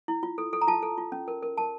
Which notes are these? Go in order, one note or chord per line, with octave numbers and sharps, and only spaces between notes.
E4
F4
A4
A4
A#5
F4 A5
A4
F4
C#4
A#4
A#4
A#4 A5